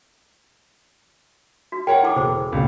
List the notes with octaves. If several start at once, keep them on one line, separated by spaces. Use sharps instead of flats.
F#4
A#4 C#5 F#5 G5
E4 A4 D6
E1 C5 D6
C#2 A#2 C#3